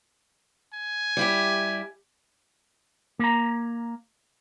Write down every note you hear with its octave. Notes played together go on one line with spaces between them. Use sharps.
G#5
G3 E4 G4
A#3 A#5